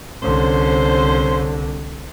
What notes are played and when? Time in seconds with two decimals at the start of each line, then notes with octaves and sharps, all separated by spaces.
0.22 C2 D3 C#4 C5